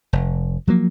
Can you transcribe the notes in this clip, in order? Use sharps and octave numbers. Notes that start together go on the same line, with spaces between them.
F1
F3 F#3 A#3